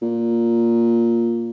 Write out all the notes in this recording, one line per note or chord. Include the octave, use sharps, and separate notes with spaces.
A#2